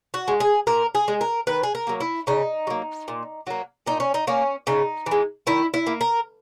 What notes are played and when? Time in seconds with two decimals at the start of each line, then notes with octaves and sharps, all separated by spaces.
0.14 F#4
0.28 G#3
0.40 G#4
0.67 A#2 A#4
0.95 G#4
1.08 G#3
1.21 A#4
1.47 D#3 B4
1.63 G#4
1.75 A#4
1.87 F#3 A#3
2.00 E4
2.27 C#3 D#4
2.67 F#3 A#3
3.08 A#2
3.47 F#3 A#3
3.86 A#2 D#4
4.00 C#4
4.14 D#4
4.27 A#3 C#4
4.67 C#3 D#4
5.06 E3
5.11 G#3
5.47 D#3 E4
5.74 E4
5.87 A#3
6.01 A#4